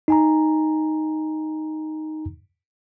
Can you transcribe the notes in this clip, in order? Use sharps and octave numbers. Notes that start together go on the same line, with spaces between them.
D#4 G#5 A#5